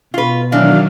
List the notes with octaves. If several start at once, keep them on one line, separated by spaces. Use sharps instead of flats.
B2 F4 B4
D#3 E3 F#3 D4 F5